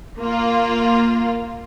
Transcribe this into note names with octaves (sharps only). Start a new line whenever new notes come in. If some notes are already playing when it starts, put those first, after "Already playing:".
A#3 F4